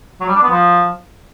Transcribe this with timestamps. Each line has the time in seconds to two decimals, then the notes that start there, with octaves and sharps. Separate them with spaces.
0.21 F#3
0.28 G3
0.35 D4
0.43 B3
0.50 F3